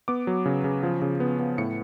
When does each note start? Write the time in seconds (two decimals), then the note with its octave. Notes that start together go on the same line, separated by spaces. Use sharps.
0.08 B3 D6
0.27 F#3
0.46 C#3
0.64 C#3
0.83 F3
1.02 C#3
1.20 B3
1.39 B3
1.58 A2 C#7